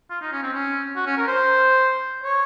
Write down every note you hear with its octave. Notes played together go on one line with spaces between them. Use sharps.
F4
D#4
C#4
C4
C#4
F#4
C#4
A#4
C5
C#5